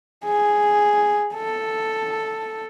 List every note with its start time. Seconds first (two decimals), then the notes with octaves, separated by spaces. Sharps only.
0.24 G#4
1.35 A4